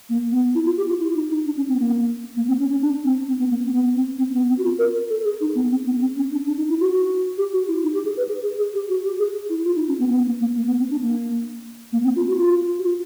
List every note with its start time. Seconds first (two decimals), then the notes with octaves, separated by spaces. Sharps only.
0.09 A#3
0.31 B3
0.55 E4
0.65 F4
0.77 G4
0.89 F4
1.00 E4
1.15 D#4
1.30 D#4
1.45 D4
1.57 C#4
1.68 C4
1.75 B3
1.79 A#3
2.36 A#3
2.48 C4
2.59 C#4
2.70 C#4
2.81 D4
3.05 C4
3.27 C4
3.39 B3
3.50 A#3
3.66 C4
3.72 B3
3.96 C4
4.18 C4
4.30 C4
4.34 B3
4.49 C4
4.58 F#4
4.64 F4
4.79 A#4
5.10 A4
5.25 G#4
5.40 D#4
5.55 B3
5.71 C4
5.86 B3
6.00 C4
6.16 C#4
6.31 D4
6.47 D4
6.58 D#4
6.69 E4
6.80 F#4
6.91 F#4
7.38 G4
7.53 F#4
7.68 E4
7.83 D#4
7.94 G4
8.05 G#4
8.17 B4
8.28 G#4
8.43 G#4
8.59 G#4
8.74 G4
8.89 F#4
9.04 G4
9.19 G#4
9.49 E4
9.65 F4
9.76 D#4
9.88 C#4
9.99 B3
10.10 B3
10.26 A#3
10.41 A#3
10.55 A#3
10.67 B3
10.79 C4
10.90 D4
11.01 A#3
11.92 A#3
12.04 C4
12.16 F4
12.27 F#4
12.38 F4
12.79 F#4
12.84 F4